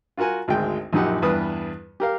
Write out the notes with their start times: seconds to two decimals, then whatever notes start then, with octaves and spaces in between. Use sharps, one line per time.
0.17 F4 F#4 A#4 F#5 G#5
0.48 G#1 D2 G#3 G5
0.93 A#1 F#2 D#4 G4 F#5
1.22 E2 G2 B4 D#6
2.00 G4 A#4 F5